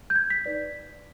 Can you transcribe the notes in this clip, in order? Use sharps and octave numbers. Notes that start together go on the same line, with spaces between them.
G6
G#6
B6
D#4 B4 D5 B6